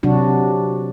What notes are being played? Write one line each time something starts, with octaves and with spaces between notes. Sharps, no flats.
C3 F#3 D4 F#4